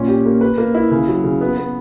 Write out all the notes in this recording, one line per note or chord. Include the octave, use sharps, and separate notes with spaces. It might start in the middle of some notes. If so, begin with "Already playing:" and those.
Already playing: A#2 C#4
G4
A#3
B4
A#3
E4
C#3
F#3
C#3
B3
B3